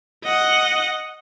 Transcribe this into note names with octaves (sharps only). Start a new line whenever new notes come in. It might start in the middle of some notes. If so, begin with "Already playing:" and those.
D#5 F#5